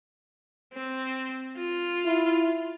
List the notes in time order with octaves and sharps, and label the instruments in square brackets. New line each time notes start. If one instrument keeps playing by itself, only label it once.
[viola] C4
F4
[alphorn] E4